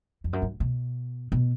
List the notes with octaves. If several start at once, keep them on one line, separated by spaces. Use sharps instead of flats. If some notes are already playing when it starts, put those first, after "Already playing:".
F2
F#2
G2
B2
B2